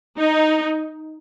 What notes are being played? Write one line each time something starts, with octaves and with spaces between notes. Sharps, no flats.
D#4